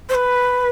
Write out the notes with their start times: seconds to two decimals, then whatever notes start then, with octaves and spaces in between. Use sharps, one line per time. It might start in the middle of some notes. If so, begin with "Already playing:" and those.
0.09 C5
0.15 B4